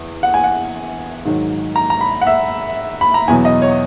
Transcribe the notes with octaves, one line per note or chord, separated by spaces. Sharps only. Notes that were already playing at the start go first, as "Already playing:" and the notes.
Already playing: E2
F#5
G#5
F#5
G#2 D#3 F#3
A#5
A#5
B5
F#5
E5
B5
A#5
E2 B2 F#3 G#5
D#5
C#5